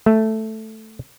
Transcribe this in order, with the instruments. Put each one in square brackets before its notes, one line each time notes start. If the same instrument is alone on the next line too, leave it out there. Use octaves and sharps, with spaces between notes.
[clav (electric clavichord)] A3